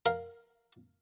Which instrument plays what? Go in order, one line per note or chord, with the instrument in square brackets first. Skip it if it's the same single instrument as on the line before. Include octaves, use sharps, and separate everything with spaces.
[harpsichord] A#4 F5